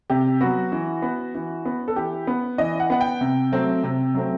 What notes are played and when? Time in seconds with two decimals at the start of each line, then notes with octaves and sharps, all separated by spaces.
0.10 C3 G4
0.41 F#3 B3 F#4
0.72 E3
1.02 B3
1.35 E3
1.65 B3
1.88 A4
1.96 E3 G4
2.27 B3
2.58 E3 D#5
2.80 F#5
2.90 B3 F#5
3.01 G5
3.21 C3
3.52 F#3 A3 C4
3.84 C3
4.14 F#3 A3 C4